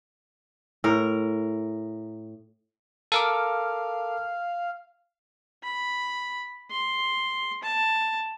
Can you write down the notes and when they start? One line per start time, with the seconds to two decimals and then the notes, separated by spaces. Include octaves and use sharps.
0.84 A2 A#4
3.12 A4 A#4 F5 D6
5.63 B5
6.71 C6
7.63 A5